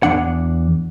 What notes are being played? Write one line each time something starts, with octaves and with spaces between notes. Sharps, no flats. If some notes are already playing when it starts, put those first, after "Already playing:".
E2 D4 F#5